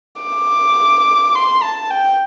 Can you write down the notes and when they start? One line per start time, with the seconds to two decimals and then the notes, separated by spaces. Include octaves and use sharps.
0.22 D6
1.35 C6
1.62 A5
1.90 G5